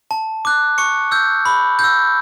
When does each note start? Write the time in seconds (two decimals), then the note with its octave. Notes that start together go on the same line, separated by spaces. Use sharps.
0.11 A5
0.45 D6 F#6
0.78 C#6 C#7
1.11 E6 G6
1.46 B5
1.79 G6
1.84 E6